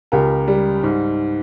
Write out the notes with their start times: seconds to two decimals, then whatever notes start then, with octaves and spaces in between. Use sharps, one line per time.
0.12 C#2 G4 A#4
0.48 G3
0.83 G#2